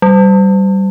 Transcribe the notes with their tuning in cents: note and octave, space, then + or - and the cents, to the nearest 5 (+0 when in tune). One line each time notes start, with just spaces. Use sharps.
G3 -25